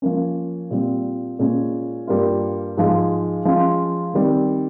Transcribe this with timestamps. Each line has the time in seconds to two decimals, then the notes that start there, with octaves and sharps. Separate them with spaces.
0.02 F3 A#3 C#4
0.71 A#2 G3 C4
1.39 A#2 G#3 C#4
2.07 G2 G3 A#3 F4
2.77 G#2 F3 G#3
3.45 F3 G#3 C#4 F4
4.14 D#3 G3 C4